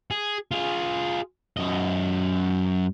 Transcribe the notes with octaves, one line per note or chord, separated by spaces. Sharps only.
G#4
F4 G#4
F#2 D#5